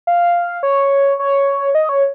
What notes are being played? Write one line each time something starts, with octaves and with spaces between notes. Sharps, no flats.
F5
C#5
C#5
D#5
C#5